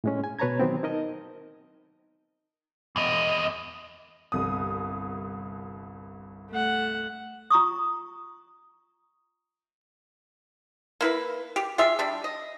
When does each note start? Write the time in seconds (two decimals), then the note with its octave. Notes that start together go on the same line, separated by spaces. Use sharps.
0.04 A2 G#3 C#4
0.24 G#5
0.39 B2 B4 C#5 A5 A#5 G#6
0.60 D#3 F#3 B3 C4
0.83 D#4 A#4 D#5 A5
2.96 E2 D#5
4.32 G1 C2 D#6
6.51 A3 F#5
7.50 F4 A#5 C#6 D#6
11.01 A#3 E4 B4
11.56 G4
11.78 F4 G4 G#4 E5
11.99 G3 D4
12.24 D#5